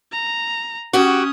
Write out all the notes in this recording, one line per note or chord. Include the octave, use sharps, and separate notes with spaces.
A#5
C#4 F#4 G4 D#6